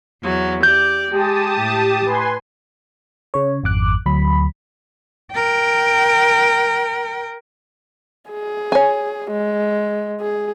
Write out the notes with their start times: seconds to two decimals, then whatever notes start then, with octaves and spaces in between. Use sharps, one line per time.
0.22 E2 F#3
0.63 G4 D5 G6
1.11 G#3 G4 A5 D#6
1.55 A2
2.06 B4 G#5 C6
3.34 C#3 C#5
3.64 G#1 F2 D6 F#6
4.06 D2 F#3 B5
5.33 A#4 G5
8.30 G#4
8.72 C#5 G#5
9.31 G#3
10.21 G#4